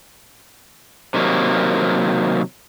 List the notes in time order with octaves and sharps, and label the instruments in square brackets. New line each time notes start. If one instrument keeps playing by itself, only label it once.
[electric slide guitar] C3 D#3 F#3 A#3